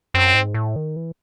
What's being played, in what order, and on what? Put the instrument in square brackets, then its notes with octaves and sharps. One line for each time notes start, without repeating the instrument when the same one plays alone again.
[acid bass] F#2 [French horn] C4
[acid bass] G#2
A2
D#3
E3